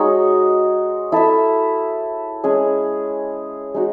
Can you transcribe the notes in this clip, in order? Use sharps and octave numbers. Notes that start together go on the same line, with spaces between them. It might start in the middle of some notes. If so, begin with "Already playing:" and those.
Already playing: G#3 D#4 F#4 C#5
E4 A4 E5
G#3 C#4 G#4
G#3 D#4 F#4